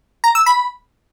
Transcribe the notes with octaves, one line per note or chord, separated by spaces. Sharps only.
A#5
E6
B5